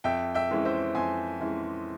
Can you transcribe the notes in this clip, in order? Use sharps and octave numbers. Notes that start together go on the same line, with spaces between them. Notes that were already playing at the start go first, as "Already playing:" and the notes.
F2 E5 G5
E5 G5
E3 G#3 C#4 E4
C5 E5
F2 G#5 C6
E3 G#3 C#4 E4